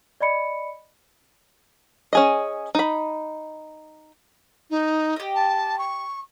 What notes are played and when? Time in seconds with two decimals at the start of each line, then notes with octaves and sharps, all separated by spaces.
0.21 D5 D#5 B5 C#7
2.13 C#4 G#4 D#5
2.75 D#4 B5
4.70 D#4
5.16 G4 D#5
5.35 A5
5.78 C#6